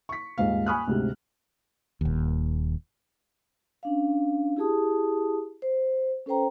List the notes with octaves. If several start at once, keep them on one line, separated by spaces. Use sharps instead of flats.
C#6 B6
D#1 G#2 G#3 F5
G#5 B5 C#6 D#6 F6 F#6
D2 G#2 C3
D#1 D#2
C#4 D4 F5
E4 G4 G#4 A5 D#6
C5
C#4 A4 B4 C5 G5 A#5